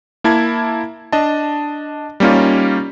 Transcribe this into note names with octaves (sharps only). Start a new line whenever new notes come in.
A#3 E4 A5 G#6
D4 D#5 A5
G3 A#3 C#4 D#4 F4